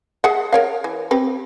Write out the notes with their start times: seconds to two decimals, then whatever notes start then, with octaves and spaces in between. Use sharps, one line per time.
0.24 G#4 E5 F#5
0.52 A#4 C#5 F5
0.84 E3
1.11 C4 G4 B4